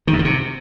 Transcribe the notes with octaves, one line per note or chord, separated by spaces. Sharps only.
D#3
F#2
D#3
C3